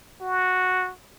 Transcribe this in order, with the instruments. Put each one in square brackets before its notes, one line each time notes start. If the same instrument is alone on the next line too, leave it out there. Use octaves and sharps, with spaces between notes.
[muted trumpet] F#4